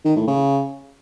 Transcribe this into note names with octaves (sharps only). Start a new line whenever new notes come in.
D#3
A2
C#3